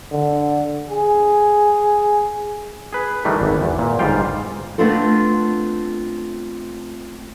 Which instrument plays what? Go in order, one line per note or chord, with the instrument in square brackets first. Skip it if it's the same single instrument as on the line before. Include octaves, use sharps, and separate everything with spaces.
[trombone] D3
G#4
[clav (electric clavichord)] G#4 B4
D#3 E3 G3 A3 D4
G#1
E2
A#2
G1 G#2 G3 F4 F5 G5
[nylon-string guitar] A3 B3 C4 D4 F4 A4